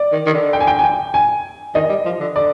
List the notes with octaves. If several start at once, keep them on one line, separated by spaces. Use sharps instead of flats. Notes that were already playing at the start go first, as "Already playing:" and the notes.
Already playing: D5
D#3
D#3
D3
G5
G#5
G5
G#5
G5
G#5
D#3 D#5
G3
F3
D3
D3 D5